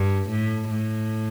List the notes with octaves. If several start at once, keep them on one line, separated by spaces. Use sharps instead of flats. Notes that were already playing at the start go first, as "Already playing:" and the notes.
Already playing: G2
A2
A2